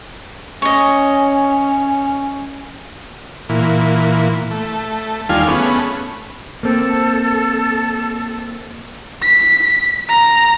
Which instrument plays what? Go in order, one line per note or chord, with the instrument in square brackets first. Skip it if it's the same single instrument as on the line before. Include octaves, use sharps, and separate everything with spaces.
[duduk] C#4 [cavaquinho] C#5 D#5
[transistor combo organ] A#2 E3
A3
D#2 G3 D4 F4 F5 G#5
A3 B3 C#4 G#4
[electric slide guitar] A#3 C4 [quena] A4
[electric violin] B6
A#5